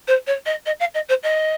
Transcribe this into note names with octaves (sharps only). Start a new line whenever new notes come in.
C5
C#5
D#5
D#5
F5
D#5
C5
D#5